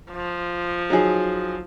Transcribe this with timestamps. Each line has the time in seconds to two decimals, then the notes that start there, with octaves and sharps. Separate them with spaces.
0.11 F3
0.90 F#3 D#4 G#4